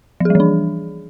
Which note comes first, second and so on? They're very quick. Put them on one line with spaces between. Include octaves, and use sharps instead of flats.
F3 G#4 G3 E3 D4